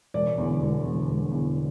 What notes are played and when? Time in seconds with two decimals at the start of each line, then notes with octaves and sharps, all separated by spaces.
0.14 E1 D5
0.38 E2 D3
0.61 E1
0.85 E2 D3
1.09 E1
1.32 E2 D3